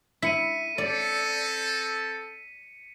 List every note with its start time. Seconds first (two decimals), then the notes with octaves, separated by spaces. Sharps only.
0.22 E4 B6 C#7 D#7
0.78 C4 A4 D5